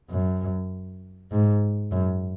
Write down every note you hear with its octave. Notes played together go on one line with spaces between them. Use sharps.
F#2
G#2
F#2